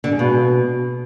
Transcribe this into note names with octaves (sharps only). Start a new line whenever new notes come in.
D3
G#3
B2